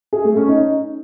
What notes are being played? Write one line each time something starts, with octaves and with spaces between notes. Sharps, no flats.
G#4
A3
C#4
D#4